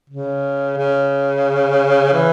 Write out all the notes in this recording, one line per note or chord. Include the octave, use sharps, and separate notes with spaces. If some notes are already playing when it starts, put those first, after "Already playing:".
C#3
C#3
E3